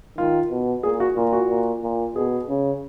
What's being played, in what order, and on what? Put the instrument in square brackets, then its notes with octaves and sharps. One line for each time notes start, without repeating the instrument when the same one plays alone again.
[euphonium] D#3 [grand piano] F4
[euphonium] B2
[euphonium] A#2 [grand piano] G#4
[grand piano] F#4
[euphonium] A#2 [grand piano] F4
[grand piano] F#4
[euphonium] A#2
A#2
[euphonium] B2 [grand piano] G#4
[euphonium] C#3